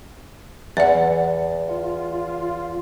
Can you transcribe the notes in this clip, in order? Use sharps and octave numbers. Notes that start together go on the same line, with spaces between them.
E2 D5 F#5
F4